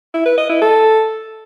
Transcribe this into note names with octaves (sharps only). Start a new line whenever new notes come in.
E4
B4
D#5
E4
A4